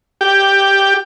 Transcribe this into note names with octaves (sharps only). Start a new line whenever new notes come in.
G4